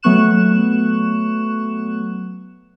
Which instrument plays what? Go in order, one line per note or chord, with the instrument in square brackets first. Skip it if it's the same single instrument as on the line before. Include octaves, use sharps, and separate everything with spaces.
[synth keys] F#3 A3 B3 C#6 F#6 E7